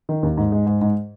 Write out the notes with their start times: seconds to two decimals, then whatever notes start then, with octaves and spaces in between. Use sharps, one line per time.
0.09 D#3
0.23 D#2
0.37 G#2
0.52 G#3
0.66 G#2
0.81 G#2